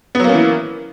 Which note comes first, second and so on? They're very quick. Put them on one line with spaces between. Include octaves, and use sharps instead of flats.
B3 F#3 A#3 C#4 E3